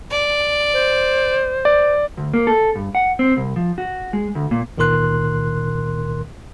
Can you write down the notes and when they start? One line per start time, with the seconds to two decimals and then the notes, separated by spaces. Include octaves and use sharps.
0.11 D5
0.73 C5
1.65 D5
2.17 D2
2.34 A#3
2.47 A4
2.75 G2
2.95 F#5
3.19 C4
3.37 C2
3.56 F3
3.78 F#4
4.13 G#3
4.35 D2
4.51 A#2
4.78 C#2 A#2 D#3 A#4 C6 F#6